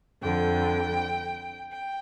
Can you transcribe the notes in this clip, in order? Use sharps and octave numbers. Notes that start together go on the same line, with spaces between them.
F2 D3 G5
G5